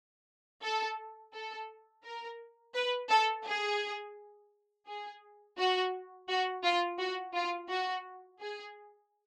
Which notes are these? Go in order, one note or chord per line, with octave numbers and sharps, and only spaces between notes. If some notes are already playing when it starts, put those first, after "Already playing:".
A4
A4
A#4
B4
A4
G#4
G#4
F#4
F#4
F4
F#4
F4
F#4
G#4